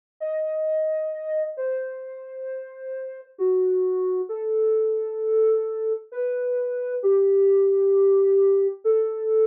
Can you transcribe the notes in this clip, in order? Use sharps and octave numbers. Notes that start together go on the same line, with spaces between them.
D#5
C5
F#4
A4
B4
G4
A4